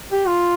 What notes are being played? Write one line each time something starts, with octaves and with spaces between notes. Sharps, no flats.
G4
F4